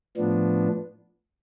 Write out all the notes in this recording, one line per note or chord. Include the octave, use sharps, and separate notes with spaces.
A2 F3 B3 D4